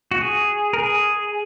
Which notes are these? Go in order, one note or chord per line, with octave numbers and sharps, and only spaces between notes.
F#4
G#4
A#4
G#4